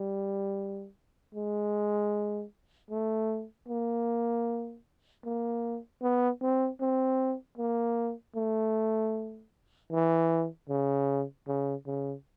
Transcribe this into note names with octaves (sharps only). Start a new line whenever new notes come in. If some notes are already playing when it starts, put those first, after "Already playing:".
Already playing: G3
G#3
A3
A#3
A#3
B3
C4
C4
A#3
A3
E3
C#3
C#3
C#3